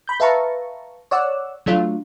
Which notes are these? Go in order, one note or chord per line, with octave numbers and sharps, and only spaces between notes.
B5 G6
B4 E5 F5 A5 A#5 C#6
C#5 D5 F#5 E6
F#3 A3 D4 F4